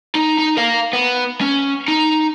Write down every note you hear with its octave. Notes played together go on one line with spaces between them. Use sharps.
D#4
D#4
A#4 F5
B3
C#4
D#4